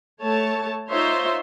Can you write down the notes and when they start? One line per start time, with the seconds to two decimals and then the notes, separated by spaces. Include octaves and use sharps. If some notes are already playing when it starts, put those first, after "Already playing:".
0.21 A3 C#5 A5
0.89 D#4 F4 C5 C#5 E5 C6